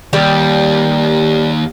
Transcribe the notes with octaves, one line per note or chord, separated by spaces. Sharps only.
D#2 G3